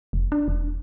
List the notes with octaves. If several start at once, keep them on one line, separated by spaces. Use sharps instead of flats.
F1
D4
E1